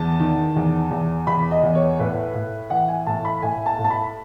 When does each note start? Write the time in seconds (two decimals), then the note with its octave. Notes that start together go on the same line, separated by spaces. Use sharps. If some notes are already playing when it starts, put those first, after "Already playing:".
Already playing: E2 A5
0.20 D#3
0.56 E2
0.91 E2
1.27 E2 B5
1.51 D#5
1.63 E2
1.75 C#5
1.99 A2 B4
2.34 A2
2.70 E3 F#5
2.88 G#5
3.07 A2 A5
3.25 B5
3.42 A2 G#5
3.66 A5
3.79 A2
3.84 A5
3.90 B5